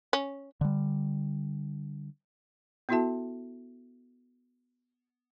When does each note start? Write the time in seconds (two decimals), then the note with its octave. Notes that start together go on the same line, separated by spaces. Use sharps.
0.13 C#4
0.61 D3 G3
2.89 B3 E4 F#4 A4 E5 A5